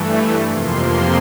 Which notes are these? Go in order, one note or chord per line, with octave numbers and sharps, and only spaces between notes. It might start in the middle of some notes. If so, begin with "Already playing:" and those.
Already playing: G2 E3 A3
F2 C3 F3 A#3 C6